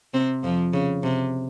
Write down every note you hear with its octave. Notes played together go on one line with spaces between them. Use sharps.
C3 C4
F2 F3
C#3
C3